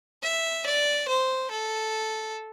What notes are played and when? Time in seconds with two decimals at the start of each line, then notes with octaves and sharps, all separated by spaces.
0.23 E5
0.66 D5
1.08 C5
1.51 A4